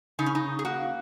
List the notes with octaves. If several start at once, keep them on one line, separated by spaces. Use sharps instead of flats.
C#3 D#4
C#4
D#4
G#4
A#3 F#4